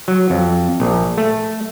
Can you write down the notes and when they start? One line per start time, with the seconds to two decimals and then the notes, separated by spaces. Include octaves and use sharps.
0.08 F#3
0.30 F2
0.80 A#1
1.18 A3